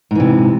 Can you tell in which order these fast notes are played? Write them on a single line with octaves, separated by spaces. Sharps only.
G#2 E3 C3